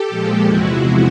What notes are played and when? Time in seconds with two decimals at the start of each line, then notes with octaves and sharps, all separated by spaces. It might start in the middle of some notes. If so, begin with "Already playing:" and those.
Already playing: G4 A4
0.09 A#2 F3 G#3
0.46 E2 C3 F3 G#3 E4 F#4